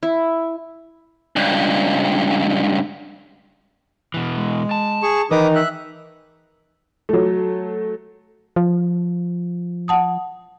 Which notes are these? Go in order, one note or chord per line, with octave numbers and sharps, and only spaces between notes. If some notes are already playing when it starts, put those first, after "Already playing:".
E4
C#2 G2
B2 E3
G#3
A5
G#4 C#6
D#3 E3 D#4 B4 D6 D#6
E5 F#6
F#3 A3
F3
F#5 A5 D#6